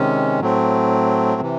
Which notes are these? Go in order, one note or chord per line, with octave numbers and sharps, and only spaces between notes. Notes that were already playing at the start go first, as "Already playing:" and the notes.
Already playing: C3 D#3 G#3 C#4
A2 F#3 A3 C4
C3 E3